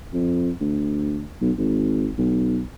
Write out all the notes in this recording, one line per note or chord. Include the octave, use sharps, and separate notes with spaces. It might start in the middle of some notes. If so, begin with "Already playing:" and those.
F2
D2
B1
G#1
B1